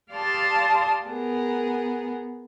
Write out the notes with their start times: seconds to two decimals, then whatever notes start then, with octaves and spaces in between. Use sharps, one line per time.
0.12 G4 D5 F5 A5 C6 D#6
1.05 B3 G#4 A#4